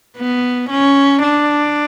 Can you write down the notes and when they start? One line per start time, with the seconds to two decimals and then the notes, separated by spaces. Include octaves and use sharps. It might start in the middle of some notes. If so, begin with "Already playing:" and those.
0.17 B3
0.70 C#4
1.23 D4